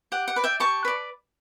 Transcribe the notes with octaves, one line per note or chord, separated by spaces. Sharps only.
G4 F#5
F#5
B4 D5
E5 G5
G4 A5 C#6
B4 D5